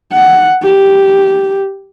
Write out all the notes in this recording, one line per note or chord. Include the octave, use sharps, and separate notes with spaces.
F#5
G4